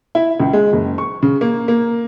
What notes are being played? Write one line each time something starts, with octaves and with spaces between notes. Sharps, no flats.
E4
C#2
G#3
F#1
C#6
C#3
A#3
A#3